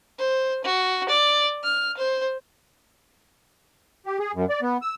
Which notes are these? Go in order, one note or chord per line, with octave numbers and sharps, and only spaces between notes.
C5
F#4
D5
F6
C5
G4
G#4
F#2
D5
B3
E6